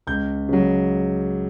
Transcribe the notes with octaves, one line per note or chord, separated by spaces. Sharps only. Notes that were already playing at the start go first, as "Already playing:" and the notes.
C#2 G6
C#3 F#3